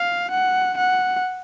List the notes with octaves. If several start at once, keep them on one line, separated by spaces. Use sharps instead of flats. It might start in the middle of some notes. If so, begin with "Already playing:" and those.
Already playing: F5
F#5
F#5